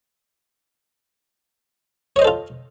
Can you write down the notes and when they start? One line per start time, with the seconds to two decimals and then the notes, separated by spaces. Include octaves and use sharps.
2.16 C#5
2.19 D#5
2.22 C5
2.25 A4
2.27 F4